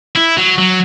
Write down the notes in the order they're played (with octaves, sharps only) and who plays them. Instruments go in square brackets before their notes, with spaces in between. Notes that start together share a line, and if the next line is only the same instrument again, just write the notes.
[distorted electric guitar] E4
F#3
F#3